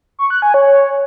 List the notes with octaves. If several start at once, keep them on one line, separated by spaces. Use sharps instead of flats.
C#6
F#6
G#5
C#5